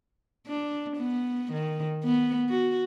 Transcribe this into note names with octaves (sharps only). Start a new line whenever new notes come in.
D4
B3
D#3
B3
F#4